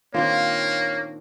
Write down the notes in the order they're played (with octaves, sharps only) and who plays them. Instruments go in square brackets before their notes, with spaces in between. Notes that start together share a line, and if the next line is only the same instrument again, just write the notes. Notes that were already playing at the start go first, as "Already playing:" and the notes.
[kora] A#2 F4 [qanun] D#3 C4 D4 [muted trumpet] A#3 [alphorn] C#5